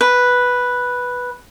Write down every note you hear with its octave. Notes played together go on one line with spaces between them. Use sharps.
B4